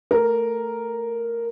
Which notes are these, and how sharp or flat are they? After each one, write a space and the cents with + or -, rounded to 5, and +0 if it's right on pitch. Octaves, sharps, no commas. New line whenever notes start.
A3 +15 A#4 +0